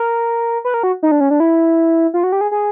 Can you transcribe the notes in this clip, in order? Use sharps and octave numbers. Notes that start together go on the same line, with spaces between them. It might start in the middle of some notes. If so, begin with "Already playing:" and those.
Already playing: A#4
B4
A#4
F#4
D#4
D4
C#4
D4
E4
F4
F#4
G4
G#4
G#4